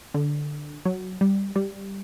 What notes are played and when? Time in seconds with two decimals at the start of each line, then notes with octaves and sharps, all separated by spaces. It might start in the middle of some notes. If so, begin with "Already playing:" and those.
0.14 D3
0.85 F#3
1.21 G3
1.56 G3